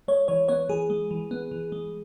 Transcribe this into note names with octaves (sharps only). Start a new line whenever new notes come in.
G#3 C#5
E3 C#5
B3 C#5
E3 G#4
G#3
E3
B3
E3
G#3